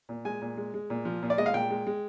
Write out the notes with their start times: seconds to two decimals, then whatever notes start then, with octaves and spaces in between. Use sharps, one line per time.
0.09 A#2
0.25 G#3 G#5
0.42 A#2
0.57 G#3
0.74 G#3
0.90 A#2
1.05 F3
1.23 A#2
1.30 D5
1.38 G#3 D#5
1.46 F5
1.54 A#2 G5
1.71 G#3
1.87 G#3